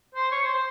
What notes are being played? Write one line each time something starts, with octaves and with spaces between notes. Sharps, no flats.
C5
C#5
C5
C5